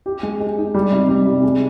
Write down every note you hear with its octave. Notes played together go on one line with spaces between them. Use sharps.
G4
G#3
G#3
D#4
G3
C3
G3
C3
G#3